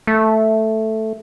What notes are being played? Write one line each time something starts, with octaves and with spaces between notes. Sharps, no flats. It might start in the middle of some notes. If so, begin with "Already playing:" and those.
A3